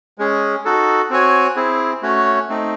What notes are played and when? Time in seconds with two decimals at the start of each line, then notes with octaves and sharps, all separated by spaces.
0.18 G#3 C#4 G#4
0.65 D#4 F#4 A4
1.10 C4 F#4 C#5 G#5
1.56 C4 E4 G#4
2.02 A3 C#4 F#4 C#5
2.49 A3 C4 D#4